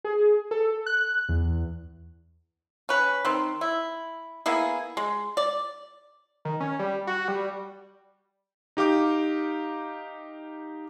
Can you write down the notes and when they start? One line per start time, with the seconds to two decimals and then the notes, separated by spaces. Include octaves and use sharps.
0.04 G#4
0.51 A4
0.86 F#6
1.29 E2
2.89 C#4 B4
3.25 D#3 C4 D#4
3.61 E4
4.46 A#3 B3 E4 G#4
4.97 G#3
5.37 D5
6.45 D#3
6.60 C#4
6.79 G3
7.07 F#4
7.28 G3
8.77 D#4 G4 F5 D6